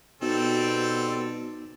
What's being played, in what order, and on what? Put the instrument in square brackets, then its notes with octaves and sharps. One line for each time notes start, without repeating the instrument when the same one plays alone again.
[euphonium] B2 [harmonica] G3 C4 A4 [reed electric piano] B3 D#4 F#4